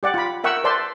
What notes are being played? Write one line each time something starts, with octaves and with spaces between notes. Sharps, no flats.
G4 D5 F#5
F4 B5
A#4 E5 F#5 G5 C#6 E6
B4 C5 D5 E5 A5 C6